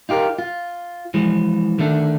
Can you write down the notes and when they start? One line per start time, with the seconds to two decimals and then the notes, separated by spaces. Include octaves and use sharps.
0.09 D#4 F4 G4 A#4
0.39 F4
1.14 E3 F3 G#3
1.79 D3 D#3 A3 D4